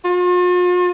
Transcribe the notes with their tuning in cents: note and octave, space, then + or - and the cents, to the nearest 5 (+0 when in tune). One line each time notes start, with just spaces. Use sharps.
F4 +45